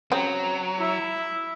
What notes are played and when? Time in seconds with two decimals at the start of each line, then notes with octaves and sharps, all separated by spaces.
0.12 C#3 F#3 C4 G4 A#5
0.78 E4 E5